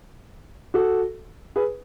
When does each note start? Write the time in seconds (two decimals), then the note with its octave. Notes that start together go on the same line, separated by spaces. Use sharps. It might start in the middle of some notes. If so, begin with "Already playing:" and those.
0.74 F#4 A4
1.56 G#4 B4